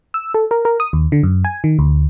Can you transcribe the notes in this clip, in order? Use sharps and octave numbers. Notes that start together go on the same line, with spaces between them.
E6
A4
A#4
A#4
D#6
D#2
D3
F#2
G#5
D#3
D2